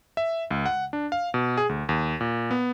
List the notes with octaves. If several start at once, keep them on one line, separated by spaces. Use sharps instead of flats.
E5
C#2
F#5
D4
F5
B2
G#4
D2
D#2
A#2
B3